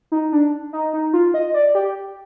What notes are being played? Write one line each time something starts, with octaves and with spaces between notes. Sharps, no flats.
D#4
D4
D#4
D#4
F4
D#5
D5
G4